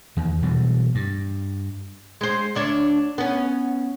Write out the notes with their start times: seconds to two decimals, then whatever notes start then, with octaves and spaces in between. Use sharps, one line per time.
0.17 E2 D#3
0.43 B2 E3 F#3 G3
0.95 G2
2.21 G#3 C5
2.55 D2 D4 C#5
3.18 B3 C#4